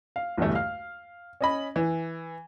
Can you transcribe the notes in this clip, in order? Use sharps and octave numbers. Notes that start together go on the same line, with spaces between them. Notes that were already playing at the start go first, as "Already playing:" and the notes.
F5
B1 E2 G2 D3 A3
F5 F6
C#4 D#5 B5
E3